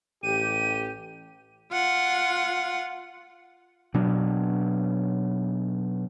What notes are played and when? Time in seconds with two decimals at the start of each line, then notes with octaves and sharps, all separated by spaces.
0.23 A1 G4 D#7
1.72 F4 F#5
3.94 B2 F#3 D4